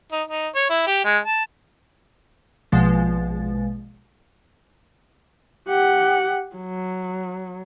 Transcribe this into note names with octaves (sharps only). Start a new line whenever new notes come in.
D#4
D#4
C#5
E4
G4
G#3
A5
A#1 B2 F3 G#3 A6
G4 F#5
F#3